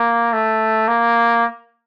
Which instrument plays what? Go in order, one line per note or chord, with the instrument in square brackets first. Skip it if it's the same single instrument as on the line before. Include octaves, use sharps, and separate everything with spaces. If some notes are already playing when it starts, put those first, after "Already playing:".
Already playing: [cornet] A#3
A3
A#3